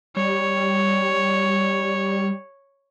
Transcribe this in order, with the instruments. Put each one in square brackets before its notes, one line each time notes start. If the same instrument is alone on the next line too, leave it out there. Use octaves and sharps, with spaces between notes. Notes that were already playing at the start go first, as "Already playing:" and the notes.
[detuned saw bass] G3 [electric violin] C#5